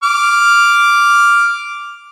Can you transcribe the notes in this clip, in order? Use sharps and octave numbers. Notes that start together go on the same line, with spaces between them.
D6 F6